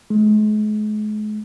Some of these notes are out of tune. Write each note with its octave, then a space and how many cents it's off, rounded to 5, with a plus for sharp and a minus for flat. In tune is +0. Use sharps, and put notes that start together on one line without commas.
G#3 +40